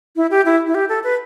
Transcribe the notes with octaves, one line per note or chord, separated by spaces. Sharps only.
E4
G4
E4
E4
G4
A4
B4